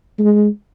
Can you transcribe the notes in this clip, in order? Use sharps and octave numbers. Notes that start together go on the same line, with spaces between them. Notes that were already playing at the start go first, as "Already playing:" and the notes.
G#3